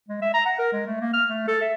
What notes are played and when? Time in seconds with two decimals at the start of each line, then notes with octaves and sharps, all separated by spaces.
0.08 G#3
0.22 E5
0.34 A#5
0.46 F#5
0.59 A#4
0.72 G#3
0.86 A3
1.01 A#3
1.13 F6
1.29 A3
1.48 A4
1.61 E5